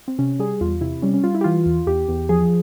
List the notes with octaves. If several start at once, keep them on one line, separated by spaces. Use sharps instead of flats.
C4
C3 C#4
G3 G#4
E2 F4
C3 E4
G3 C#4
C#4
G3 F4
E4
G4
E3 F4
E2
E2 G4
E2
F3 G#4